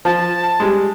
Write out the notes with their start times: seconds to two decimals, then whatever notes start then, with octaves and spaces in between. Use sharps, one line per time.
0.05 F3 A5
0.60 G3 G#3